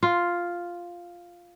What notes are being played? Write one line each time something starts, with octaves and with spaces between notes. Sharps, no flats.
F4